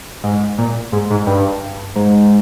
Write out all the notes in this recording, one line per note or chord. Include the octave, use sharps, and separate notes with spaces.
G#2
A#2
G#2
G#2
G2
G#2